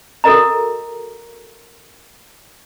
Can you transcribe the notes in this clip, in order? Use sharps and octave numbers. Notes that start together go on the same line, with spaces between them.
F#4 A4 A#4 D#5 A#5